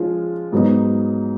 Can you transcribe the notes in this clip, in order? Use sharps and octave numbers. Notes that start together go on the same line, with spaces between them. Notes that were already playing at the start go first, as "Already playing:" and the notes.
Already playing: F3 G#3 C#4 F4
G#2 F#3 B3 D#4